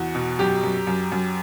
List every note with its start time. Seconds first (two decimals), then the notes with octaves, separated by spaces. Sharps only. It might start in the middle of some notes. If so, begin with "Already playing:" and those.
Already playing: E2 F#4
0.15 B2
0.39 F#2 G4
0.63 F#2
0.87 F#2
1.12 F#2